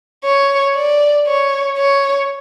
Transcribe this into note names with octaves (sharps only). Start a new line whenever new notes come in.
C#5
D5
C#5
C#5